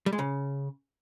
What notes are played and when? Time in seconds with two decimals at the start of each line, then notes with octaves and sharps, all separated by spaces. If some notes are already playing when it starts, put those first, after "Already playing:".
0.06 G3
0.13 G#3
0.19 C#3